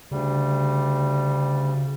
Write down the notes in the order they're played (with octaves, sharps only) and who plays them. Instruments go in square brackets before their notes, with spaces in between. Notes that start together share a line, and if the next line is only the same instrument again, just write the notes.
[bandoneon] D2 G3 [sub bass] C#3